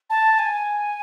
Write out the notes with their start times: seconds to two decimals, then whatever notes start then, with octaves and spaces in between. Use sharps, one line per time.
0.10 A5
0.39 G#5